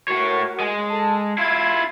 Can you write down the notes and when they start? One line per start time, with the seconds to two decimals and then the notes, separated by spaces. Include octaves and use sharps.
0.08 A2 F#4 A#4 C#5
0.60 G#3
0.91 A4 A5
1.38 E4 F4 G#6